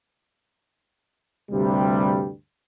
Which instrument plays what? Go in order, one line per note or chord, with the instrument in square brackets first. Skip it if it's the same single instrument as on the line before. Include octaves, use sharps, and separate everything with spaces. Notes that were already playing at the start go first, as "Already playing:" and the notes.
[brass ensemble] D2 G2 C3 G3